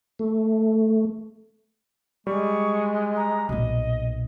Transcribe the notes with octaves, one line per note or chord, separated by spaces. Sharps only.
A3
G3 G#3 C#6
A#5
B1 A#2 D#5